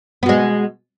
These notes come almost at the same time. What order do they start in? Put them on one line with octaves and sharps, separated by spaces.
B3 B2 G#3